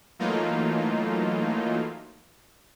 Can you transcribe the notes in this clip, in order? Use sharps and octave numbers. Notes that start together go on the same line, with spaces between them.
E3 F#3 A3 A#3 D#4 F4